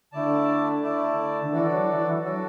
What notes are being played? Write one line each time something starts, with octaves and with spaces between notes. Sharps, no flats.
D3 A3 E4 D5 A5
A3 E4 D5 A5
D3
E3 D4 F#4 A4 D5
F#3
E3
E3
F#3 D4 F#4 A4 D5